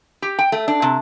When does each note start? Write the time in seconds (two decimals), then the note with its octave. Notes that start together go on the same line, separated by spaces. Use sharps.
0.22 G4
0.39 G5
0.52 A3
0.68 D4
0.82 C3